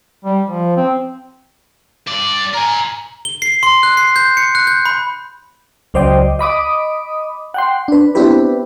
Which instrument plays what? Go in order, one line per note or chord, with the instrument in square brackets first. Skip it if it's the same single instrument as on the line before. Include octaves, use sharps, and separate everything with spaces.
[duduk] G3
F3
C4
[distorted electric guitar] G2 D5
[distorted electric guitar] A#4 G#5 [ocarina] A#5
[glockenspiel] G7
C7
C6
F#6
C7
G6
C#7
F#6
G6
B5
[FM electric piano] C#2 F#3 C5 D5 D#5 G5
D#5 B5 D6 D#6
F#5 G5 C6
D4 B4
B3 C4 D4 E4 G4 B4